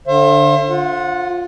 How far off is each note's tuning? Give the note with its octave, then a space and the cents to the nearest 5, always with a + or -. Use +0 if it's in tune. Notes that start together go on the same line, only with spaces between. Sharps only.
D3 +0 C5 +35 E5 +45
F4 +15 F#5 -20